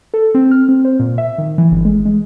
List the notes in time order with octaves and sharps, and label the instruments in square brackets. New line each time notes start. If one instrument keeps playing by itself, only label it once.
[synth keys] A4
C4
F6
C4
C5
A#2
E5
D#3
E3
G1
G#3
G#3